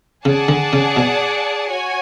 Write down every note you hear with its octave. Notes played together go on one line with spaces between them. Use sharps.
C#3 G#4 D5 F#5 A5
D3
C#3
B2
F#4 C#5 G#5